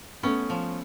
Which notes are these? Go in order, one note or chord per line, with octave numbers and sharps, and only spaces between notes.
A3 B3 C#4
F3